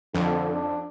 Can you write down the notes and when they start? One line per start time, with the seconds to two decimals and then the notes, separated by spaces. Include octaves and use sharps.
0.15 F2 D3
0.51 D4